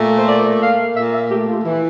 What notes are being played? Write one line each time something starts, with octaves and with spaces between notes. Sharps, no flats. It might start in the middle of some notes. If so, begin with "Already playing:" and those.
Already playing: A#2 A3
C5
A#3 D5
A#3 F5
A#2 E5
E5
A3 G4
F4
E3 E4